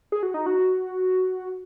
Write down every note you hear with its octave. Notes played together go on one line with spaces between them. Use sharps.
G#4
F#4
D#4
F#4